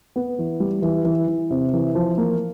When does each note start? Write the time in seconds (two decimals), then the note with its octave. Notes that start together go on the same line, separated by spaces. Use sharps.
0.16 B3
0.39 E3
0.60 G3
0.82 E3
1.05 E3
1.27 E3
1.51 C3
1.73 E3
1.95 F3
2.18 A#3